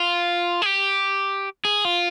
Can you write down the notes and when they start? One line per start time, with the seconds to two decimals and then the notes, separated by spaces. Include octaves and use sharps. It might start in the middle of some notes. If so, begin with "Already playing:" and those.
Already playing: F4
0.62 G#4
0.66 G4
1.65 G#4
1.85 F4